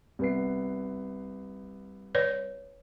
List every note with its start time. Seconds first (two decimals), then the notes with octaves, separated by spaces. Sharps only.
0.19 C2 B3 C7
2.15 B4 C#5 D5